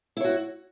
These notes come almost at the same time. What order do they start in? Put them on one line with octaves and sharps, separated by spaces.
E4 C#5 F#4